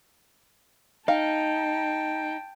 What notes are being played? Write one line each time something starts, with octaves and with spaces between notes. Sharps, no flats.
D#4 F5 G5 A5